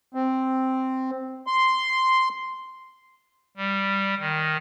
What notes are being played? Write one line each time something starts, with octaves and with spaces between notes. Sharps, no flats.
C4
C6
G3
D#3